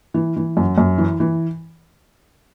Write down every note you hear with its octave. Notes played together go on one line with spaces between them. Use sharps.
E3
E3
F#2
F#2
E3
E3